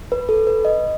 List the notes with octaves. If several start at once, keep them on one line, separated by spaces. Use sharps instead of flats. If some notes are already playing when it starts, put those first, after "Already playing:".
B4
A4
B4
D#5